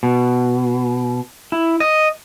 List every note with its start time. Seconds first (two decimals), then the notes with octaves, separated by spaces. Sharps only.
0.03 B2
1.52 E4
1.80 D#5